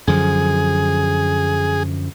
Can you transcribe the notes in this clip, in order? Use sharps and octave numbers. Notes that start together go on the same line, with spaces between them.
F#2 D3 F3 G#4